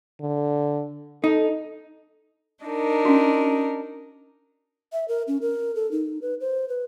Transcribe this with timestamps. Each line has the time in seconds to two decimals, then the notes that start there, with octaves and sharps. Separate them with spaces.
0.21 D3
1.24 D#4 A4
2.65 D4 D#4 A#4
3.05 C#4 F#4
4.93 E5
5.08 A#4
5.28 C#4
5.42 A#4
5.75 A4
5.91 D#4
6.22 B4
6.40 C5
6.68 B4